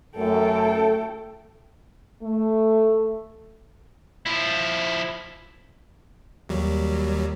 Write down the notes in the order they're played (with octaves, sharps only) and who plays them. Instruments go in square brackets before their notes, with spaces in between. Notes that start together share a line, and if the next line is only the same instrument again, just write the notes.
[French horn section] F#2 [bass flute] A3 [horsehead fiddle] A4 G5
[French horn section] A3
[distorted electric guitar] F3 E4
[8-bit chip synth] D#2 F#3 G3